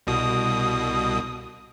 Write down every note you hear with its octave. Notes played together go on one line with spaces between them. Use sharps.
C2 B2 D#6